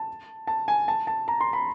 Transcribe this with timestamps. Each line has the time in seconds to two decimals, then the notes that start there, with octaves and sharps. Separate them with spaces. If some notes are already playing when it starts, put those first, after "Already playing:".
Already playing: A5
0.47 A5
0.68 G#5
0.88 A5
1.07 A5
1.28 A#5
1.41 C6
1.53 B5